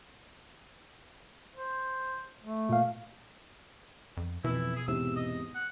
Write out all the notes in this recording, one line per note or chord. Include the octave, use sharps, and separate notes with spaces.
C5
A3
A#2 F5
F2
F2 B2 E3 E4
G#4
E2 G#2 C3 E6
D#5
F#5